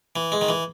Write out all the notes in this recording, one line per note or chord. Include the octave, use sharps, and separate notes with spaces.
E3
G#3
D#3
E3